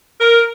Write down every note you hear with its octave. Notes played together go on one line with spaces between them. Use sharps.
A#4